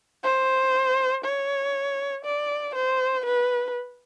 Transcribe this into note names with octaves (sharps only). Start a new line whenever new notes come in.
C5
C#5
D5
C5
B4